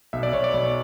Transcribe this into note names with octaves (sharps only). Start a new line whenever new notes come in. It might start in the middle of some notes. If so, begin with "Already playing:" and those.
B1 E5
D5
B1 C#5
D5
B1